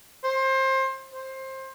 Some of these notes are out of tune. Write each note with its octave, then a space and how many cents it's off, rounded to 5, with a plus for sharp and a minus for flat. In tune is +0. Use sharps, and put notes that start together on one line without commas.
C5 +25
C5 +20